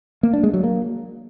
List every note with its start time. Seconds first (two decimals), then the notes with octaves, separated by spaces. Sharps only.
0.23 A#3
0.33 D4
0.43 G#3
0.54 F#3
0.64 A#3